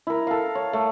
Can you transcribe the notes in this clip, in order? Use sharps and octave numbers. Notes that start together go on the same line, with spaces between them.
E4 A#4
A4 F5
C#5
A3